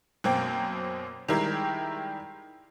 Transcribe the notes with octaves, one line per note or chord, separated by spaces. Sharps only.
F#2 B2 A#3 C4 G5
D#3 G3 G#3 E4 G4 A#4